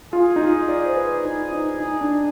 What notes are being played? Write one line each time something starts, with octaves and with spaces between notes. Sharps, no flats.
F4 G#4
D#4
F4
D5
C5
B4
D#4
D#4
D#4
D4